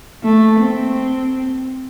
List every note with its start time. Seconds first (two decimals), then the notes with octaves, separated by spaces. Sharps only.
0.24 A3
0.60 C4